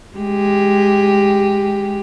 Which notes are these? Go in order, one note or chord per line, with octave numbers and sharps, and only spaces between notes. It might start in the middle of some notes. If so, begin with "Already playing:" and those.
G#3 G4